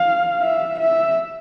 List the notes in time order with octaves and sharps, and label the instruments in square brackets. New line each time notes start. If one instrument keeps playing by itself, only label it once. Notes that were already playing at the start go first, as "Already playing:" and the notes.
Already playing: [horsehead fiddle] F5
E5
E5